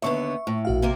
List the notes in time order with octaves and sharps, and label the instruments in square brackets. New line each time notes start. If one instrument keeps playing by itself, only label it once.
[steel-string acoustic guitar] D#2 D3 B3 [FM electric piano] E5 C#6
[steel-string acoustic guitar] A2
[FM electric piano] A#1 F#4 F5
[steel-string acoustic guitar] C3 A#3 A#4